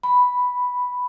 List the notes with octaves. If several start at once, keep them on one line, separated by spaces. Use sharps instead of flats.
B5